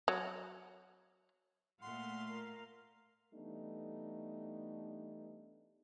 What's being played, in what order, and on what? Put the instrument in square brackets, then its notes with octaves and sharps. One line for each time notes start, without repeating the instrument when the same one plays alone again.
[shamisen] F#3
[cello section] A#2 A3 [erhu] F5 [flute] F#5 [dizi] C6
[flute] A#4
[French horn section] E3 G3 A3 B3 D4 D#4